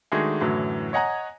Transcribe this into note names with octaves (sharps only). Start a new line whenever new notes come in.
D#3 G#3 A3 D4 F#4 G#4
F#2 A2 D3 E3 F#3
C#5 D#5 F#5 G#5 A#5